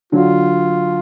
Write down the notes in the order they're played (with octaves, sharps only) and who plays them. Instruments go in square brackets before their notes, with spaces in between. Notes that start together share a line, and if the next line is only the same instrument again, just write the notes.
[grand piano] D3 F#3 [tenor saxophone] F4